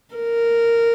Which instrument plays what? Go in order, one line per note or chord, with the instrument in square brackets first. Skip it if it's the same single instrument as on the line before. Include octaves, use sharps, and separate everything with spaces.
[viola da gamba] A#4